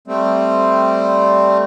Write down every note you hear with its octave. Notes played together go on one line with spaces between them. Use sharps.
G3 A3 C4